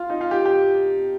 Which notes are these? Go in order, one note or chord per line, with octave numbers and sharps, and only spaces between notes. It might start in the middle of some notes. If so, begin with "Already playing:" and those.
Already playing: F4
D#4
F4
G4
G4